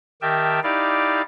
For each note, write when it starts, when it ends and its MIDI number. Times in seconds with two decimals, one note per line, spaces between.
0.22 0.60 51
0.22 0.60 67
0.22 0.60 70
0.22 0.60 76
0.22 0.60 79
0.22 0.60 81
0.63 1.22 63
0.63 1.22 64
0.63 1.22 67
0.63 1.22 74
0.63 1.22 77